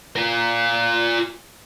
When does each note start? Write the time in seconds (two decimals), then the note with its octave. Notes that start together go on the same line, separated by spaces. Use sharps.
0.16 F4 A#4